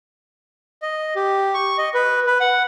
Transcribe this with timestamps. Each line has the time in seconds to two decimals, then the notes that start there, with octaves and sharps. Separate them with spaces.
0.82 D#5
1.16 G4
1.54 C#6
1.78 D#5
1.94 B4
2.26 B4
2.40 F#5